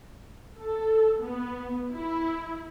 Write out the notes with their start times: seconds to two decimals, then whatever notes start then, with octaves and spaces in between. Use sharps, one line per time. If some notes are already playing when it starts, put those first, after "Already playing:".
0.59 A4
1.21 B3
1.91 E4